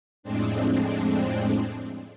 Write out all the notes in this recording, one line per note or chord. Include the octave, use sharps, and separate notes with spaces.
F2 A2 G#3 C4 D4